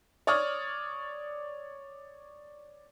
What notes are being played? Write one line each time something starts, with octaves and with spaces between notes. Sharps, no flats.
C#5 D5 C#6 D#6 F6